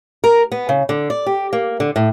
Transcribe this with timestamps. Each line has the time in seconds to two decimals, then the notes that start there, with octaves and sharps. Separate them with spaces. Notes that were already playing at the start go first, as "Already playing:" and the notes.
0.24 A#4
0.52 B3
0.69 C#3
0.89 D3
1.10 D5
1.26 G4
1.53 A#3
1.80 D3
1.96 A2